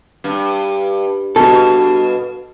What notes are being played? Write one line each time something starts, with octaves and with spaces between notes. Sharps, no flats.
G2
G2 B2 A4